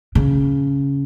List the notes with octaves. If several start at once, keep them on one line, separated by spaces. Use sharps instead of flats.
C#3